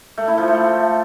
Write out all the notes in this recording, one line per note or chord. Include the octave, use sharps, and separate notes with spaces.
A3
E4
F3
A3